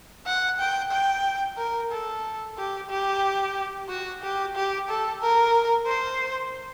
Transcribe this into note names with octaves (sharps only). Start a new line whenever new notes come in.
F#5
G5
G5
A#4
A4
G4
G4
F#4
G4
G4
A4
A#4
C5